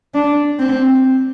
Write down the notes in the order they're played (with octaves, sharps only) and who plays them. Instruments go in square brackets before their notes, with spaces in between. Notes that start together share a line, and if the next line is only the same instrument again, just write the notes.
[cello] D4
C4